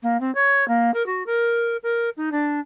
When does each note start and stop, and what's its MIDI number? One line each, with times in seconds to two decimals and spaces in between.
0.03 0.19 58
0.20 0.33 60
0.35 0.66 73
0.68 0.91 58
0.94 1.05 70
1.06 1.23 66
1.26 1.77 70
1.83 2.09 70
2.17 2.30 63
2.32 2.60 62